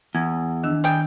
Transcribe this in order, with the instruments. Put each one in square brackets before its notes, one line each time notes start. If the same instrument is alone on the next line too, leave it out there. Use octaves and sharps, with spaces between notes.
[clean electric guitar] E2 [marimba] G#6
[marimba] D#3 D4 E6
[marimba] D#3 [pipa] G3 G#4 G5